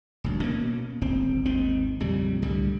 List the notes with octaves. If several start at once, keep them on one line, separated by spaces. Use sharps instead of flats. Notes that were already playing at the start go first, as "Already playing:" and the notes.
D#1 D2
B2 A#3 C#4
D1 G#1 C4
G#1 D#2 D#3 C4
A#1 F2 C#3 G3
C2 A2 D3 G3